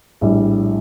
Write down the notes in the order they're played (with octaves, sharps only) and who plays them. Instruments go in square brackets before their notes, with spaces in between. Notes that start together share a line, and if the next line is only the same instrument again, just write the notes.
[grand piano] A#1 A2 G3